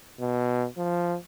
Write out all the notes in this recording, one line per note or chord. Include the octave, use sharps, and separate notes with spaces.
B2
F3